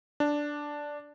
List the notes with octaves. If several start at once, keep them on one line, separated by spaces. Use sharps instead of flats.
D4